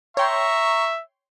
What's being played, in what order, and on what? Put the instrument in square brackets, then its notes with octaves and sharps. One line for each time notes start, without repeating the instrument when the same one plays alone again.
[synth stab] C#5 G5 C6 [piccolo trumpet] E5 [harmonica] A#5 C#6